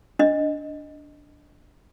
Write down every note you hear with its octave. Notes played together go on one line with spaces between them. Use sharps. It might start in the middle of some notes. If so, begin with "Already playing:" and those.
D4 D#5